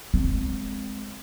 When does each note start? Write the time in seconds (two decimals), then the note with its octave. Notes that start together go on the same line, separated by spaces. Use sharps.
0.14 G#3 C4